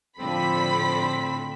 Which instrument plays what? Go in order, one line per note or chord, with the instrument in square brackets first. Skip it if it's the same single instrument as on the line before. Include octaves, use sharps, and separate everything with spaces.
[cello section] A2 D3 A4 [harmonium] F3 [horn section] C4 [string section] B5 B6